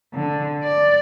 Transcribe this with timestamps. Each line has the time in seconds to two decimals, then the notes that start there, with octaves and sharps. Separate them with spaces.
0.14 D3
0.63 D5